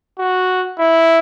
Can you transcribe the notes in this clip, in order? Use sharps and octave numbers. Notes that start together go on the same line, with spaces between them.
F#4
E4